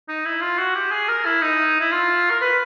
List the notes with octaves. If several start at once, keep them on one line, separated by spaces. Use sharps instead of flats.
D#4
E4
F4
F#4
G4
G#4
A#4
E4
D#4
E4
F4
A#4
B4